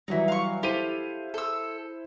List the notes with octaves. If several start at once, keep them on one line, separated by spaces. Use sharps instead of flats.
E3 F#3 G3 D#4 E4
F5 C#6
E4 G4 A4 C5 F5 D#7
A4 E6